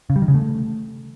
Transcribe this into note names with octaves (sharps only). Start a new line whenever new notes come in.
C#3
G3
D#3
C#3
A3